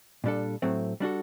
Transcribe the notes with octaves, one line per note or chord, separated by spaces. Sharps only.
A#2 G3 D4 A4
A2 F#3 A3 C4
G3 D4 F#4 A4